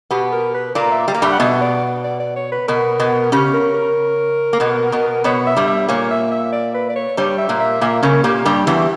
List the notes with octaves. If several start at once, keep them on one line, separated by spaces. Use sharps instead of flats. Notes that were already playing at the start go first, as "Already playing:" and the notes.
B2 B3 G4
A#4
B4
A#2 A#3 D5
E5
G3
A#3
G2 G3 E5
F#5
B2 B3 E5
D5
D5
D5
C#5
B4
B2 B3 A#4
B2 B3
C#3 C#4 G4
A#4
A#4
A#3
B2 B3
B2 B3
B2 B3 C#5
E5
G2 G3
E5
A#2 A#3 C#5
E5
E5
D5
B4
D5
C#5
G2 G3 C#5
E5
A#2 A#3
E5
A#2 A#3 E5
C#3 C#4 A#4
A#2 A#3 G4
G2 G3
E2 E3